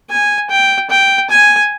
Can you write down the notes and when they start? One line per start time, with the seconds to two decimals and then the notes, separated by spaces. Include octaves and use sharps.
0.10 G#5
0.50 G5
0.90 G5
1.30 G#5